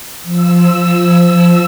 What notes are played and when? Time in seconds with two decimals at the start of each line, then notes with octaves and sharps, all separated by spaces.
0.23 F3 E6